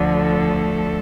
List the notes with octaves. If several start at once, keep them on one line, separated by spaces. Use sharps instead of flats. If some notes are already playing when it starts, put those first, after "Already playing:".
Already playing: D2 D3 F3
A3 A4